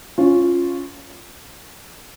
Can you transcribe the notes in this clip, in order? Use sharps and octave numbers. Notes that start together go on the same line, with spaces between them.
C#4 F4